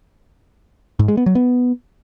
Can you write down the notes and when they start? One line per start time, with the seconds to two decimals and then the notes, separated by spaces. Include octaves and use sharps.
0.99 G#2
1.08 G#3
1.17 B3
1.26 F#3
1.35 B3